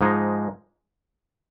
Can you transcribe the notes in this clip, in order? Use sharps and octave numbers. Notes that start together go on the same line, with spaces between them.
G#2 F3 G#3 D#4